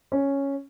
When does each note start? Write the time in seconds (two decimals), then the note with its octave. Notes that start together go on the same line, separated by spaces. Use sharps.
0.12 C#4